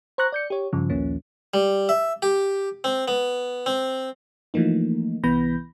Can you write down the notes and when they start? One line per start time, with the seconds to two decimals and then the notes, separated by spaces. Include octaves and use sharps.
0.18 C5 A#5 C#6 F#6 A#6
0.32 D5 G6 C#7
0.50 G4 C#5
0.73 G2 C#3 F3
0.90 A#1 D#2 F3 A#3 C#4
1.54 G3
1.89 E5
2.22 G4
2.84 C4
3.08 B3
3.66 C4
4.54 E3 F3 A3 A#3 D#4
5.24 C2 E3 B3 B5 G6 A#6